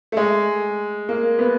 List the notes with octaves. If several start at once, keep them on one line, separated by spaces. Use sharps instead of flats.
A3
G#3
A#3
B3